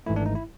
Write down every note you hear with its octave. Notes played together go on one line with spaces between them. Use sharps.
G#1 G#2 E3 A3 E4
D4
D#4
E4